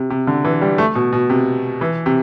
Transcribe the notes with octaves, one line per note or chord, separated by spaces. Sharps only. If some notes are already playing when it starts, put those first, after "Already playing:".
Already playing: C3
C3
D3
E3
G3
A3
B2
B2
C3
E3
C3